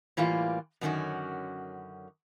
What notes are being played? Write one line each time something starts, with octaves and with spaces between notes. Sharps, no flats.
A2 E3 G3 A#3 F4
F#2 D3 D#3 C4 C#4 F#4